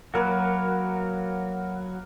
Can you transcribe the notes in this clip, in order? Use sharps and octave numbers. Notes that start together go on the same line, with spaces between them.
F#3 A#3 F#4 A#4 B4